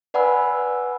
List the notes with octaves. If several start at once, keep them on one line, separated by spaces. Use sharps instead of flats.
B4 D5 F#5 G#5 B5 E6